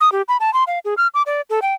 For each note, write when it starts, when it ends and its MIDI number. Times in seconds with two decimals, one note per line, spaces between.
0.01 0.12 87
0.12 0.22 67
0.28 0.37 83
0.40 0.53 81
0.54 0.64 84
0.67 0.79 77
0.85 0.94 68
0.97 1.07 89
1.14 1.22 86
1.26 1.41 74
1.50 1.60 69
1.62 1.74 79